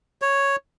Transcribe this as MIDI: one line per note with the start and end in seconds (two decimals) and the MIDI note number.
0.22 0.56 73